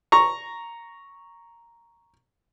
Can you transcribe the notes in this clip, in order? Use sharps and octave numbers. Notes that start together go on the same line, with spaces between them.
A#5 C#6